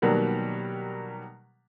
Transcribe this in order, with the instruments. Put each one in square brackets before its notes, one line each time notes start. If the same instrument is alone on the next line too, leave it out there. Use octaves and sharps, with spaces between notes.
[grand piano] B2 D#3 F#3 G3 A#3